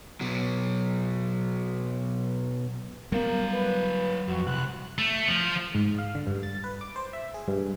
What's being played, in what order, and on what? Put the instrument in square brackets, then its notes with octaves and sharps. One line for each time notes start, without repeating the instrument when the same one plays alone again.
[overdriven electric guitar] B2 F#3
[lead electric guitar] F#3 F5 [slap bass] G3 B3 [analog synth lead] A#4
[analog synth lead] B4
[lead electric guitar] F2 [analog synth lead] F#4
[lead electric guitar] C2 [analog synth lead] F#6
[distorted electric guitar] A3
F3
[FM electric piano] G#2
F5
D3
G2
A6
B4
D6
C5
E5
G#4
G2